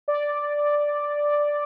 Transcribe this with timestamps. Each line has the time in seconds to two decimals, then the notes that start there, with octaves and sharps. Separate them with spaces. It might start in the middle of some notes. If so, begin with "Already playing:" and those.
0.08 D5